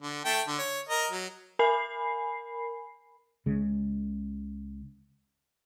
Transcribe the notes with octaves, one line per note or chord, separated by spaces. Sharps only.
D3
A3 G5 A5
D3
C#5
A#4 D#5
F#3
A#4 G#5 B5 C7
C#2 C#3 G#3